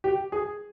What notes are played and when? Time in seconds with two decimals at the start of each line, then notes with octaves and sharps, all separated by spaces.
0.04 G4
0.32 G#4